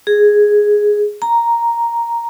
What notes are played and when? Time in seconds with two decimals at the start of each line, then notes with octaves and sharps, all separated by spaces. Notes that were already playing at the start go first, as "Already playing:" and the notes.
0.07 G#4
1.22 A#5